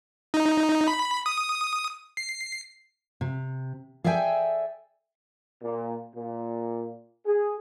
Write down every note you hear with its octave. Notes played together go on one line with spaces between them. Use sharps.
D#4
B5
D#6
C7
C3
G#4 A4 D5 E5 G5 G#5
A#2
A#2
G#4